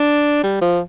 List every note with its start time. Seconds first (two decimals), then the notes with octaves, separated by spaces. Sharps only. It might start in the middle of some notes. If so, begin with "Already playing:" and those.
Already playing: D4
0.43 G3
0.61 F3